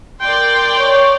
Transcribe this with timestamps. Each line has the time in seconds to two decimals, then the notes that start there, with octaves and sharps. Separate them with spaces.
0.21 A#4 D5 G5 C6
0.79 C#5